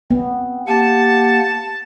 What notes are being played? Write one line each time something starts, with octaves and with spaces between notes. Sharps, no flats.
B3 C4
A#3 G4 F#5 A5